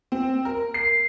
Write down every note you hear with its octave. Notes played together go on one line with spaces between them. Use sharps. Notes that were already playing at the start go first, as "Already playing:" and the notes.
C4
A#4
C7